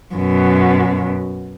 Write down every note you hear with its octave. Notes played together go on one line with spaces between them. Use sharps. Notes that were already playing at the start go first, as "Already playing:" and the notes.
F#2 B2